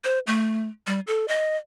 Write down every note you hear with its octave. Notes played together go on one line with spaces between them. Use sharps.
C5
A3
G3
A4
D#5